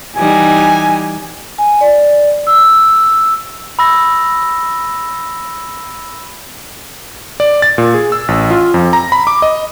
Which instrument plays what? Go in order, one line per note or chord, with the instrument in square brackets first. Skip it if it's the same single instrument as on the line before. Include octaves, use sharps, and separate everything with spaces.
[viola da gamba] E3 G3 D#4 [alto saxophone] G#5
[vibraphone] G#5
D5
E6
[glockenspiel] B5 E6 A#6
[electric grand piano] D5
A6
A#2
G#4
E6
A1
F4
F2
A#5
B5
D6
D#5